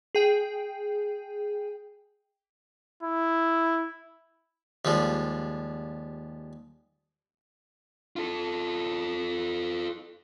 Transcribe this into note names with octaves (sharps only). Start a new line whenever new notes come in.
G#4 G5
E4
D#2 F3 G3 G#3
F4 A4